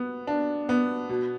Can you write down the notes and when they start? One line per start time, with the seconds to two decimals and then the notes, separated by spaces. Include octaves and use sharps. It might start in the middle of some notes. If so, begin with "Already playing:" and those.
Already playing: B3
0.27 D4
0.69 B3
1.09 B2